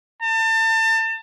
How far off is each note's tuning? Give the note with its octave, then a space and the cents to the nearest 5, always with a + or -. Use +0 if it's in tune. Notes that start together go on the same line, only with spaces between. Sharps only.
A5 +35